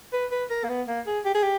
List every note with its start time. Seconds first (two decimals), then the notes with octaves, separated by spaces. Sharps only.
0.13 B4
0.31 B4
0.50 A#4
0.64 A#3
0.69 B3
0.88 A#3
1.07 G#4
1.25 G4
1.34 G#4
1.43 G4